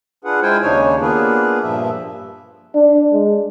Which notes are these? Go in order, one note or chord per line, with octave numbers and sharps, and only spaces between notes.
D4 F4 G#4 B4 F#5
G#3 E4 F4 C5 G5 G#5
D#2 C#3 D4 D#4 C#5 G#5
A#3 B3 D4 F4 G#4 B4
G2 A#2 F3 E5
D4
G#3